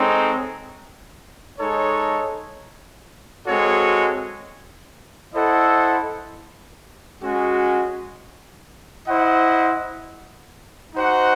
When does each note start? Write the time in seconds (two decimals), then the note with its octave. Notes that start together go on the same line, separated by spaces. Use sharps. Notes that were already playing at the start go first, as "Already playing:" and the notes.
Already playing: G#3 C4 D#4 A4 C#5
1.58 G#3 D#4 A4 C#5
3.46 G#3 C4 F#4 A4 C#5
5.33 E4 A4 C5 D#5 F#5
7.20 G#3 C#4 F#4
9.07 E4 C5 D#5 F#5
10.94 D#4 F#4 C5 F#5